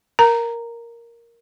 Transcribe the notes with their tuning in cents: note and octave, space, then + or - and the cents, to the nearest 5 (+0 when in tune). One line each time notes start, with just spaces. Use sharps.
A#4 +0 A#5 -10